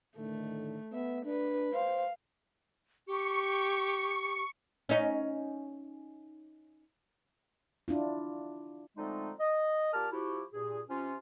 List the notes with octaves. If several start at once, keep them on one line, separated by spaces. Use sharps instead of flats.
A2 D3 D#3 A3
B3 E5
D4 B4
C5 F5
G4 C#6
C#4 D#4
D4 E4 F4
D3 F3 G#3 A3 C4 D#4
D#5
A#2 G4 A#4 A5 F6
F3 E4 F#4 G4
G2 A#2 G#4
C3 C#4 F4